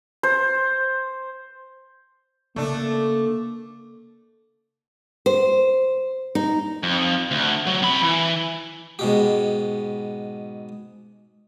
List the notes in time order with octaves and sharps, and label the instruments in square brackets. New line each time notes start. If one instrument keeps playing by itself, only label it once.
[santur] C5
[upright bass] C#3 [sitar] A3 D4 [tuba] A#3
[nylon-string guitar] C5
D#4
[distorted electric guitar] F2
D2
F#3
C3 B5
E3
[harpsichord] G#2 B2 G4